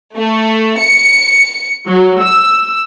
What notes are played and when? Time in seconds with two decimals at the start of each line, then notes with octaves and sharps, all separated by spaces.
0.16 A3
0.78 C#7
1.86 F#3
2.20 E6